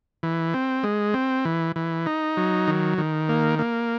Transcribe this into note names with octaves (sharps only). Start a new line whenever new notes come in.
E3
C4
G#3
C4
E3
E3
D#4
F#3
D#3
D#3
A#3
A#3